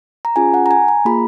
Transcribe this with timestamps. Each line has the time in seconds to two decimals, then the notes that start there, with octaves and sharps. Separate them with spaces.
0.25 A#5
0.36 C#4 F4 G#4 G#5
0.54 F#5
0.66 A#5
0.71 G#5
0.88 A#5
1.05 A#3 F4 G#4 B5